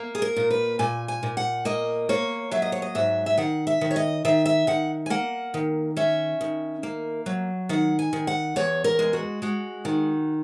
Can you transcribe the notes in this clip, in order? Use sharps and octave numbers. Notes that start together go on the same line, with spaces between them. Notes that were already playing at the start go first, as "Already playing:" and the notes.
Already playing: A#3
G#4
A#4
A#2
B4
A#2 G#5
G#5
A#2
F#5
A#3 D#5
A#3 C#5
F#3 E5
D#5
C#5
D#5
G#2 E5
E5
D#3 F#5
E5
D#3
C#5
D#5
D#3 E5
E5
D#3 F#5
G#5
A#3 F#5
D#3
C#4 E5
D#3
A#3
F#3
D#3 F#5
G#5
D#3
F#5
E2 C#5
A#4
G#3
F#4
G#3 F#4
D#3